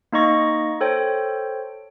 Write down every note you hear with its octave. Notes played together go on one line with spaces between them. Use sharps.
A#3 D#4 D#5 C#6 A#6
A4 C5 C#5 G5